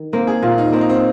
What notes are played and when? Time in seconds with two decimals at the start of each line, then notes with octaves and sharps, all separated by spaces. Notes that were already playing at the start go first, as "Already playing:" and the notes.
Already playing: D#3
0.13 A#3 C4
0.27 G#4
0.43 A#2 F4
0.58 D#4
0.72 A#3 C4
0.81 D#4
0.89 C4